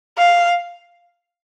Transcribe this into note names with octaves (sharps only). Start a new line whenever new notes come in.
F5